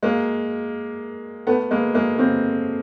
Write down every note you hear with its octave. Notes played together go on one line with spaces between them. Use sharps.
G#3 A#3
A3 B3
G#3 A#3
G#3 A#3
A#3 C4